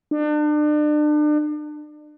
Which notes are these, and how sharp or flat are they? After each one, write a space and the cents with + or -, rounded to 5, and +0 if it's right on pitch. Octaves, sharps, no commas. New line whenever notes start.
D4 +35